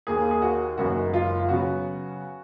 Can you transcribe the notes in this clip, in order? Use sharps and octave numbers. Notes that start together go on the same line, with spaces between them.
D#2 D#3 A#3 G#4
G#4
F#4
F#1 F#2 D#3 G#3 B3 F#4
F4
C#3 F#3 B3 F#4